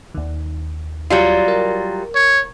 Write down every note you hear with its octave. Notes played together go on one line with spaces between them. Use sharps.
D#2 D#3
F#3 G3 F4
A#4
C#5